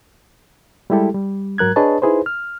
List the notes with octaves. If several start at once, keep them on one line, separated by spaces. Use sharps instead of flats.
G3 G#3 E4 G4 A4
G3
G#2 F#3 A#4 F#6 G#6
D4 G#4 B4 C#5 D#5 A5
D#4 E4 G#4 B4 C5
F6